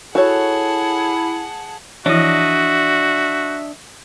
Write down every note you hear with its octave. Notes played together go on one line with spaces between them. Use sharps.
E4 F#4 G#4 A4 C#5 F#5 A5
E3 F3 D4 E4 F#4 D#5 E5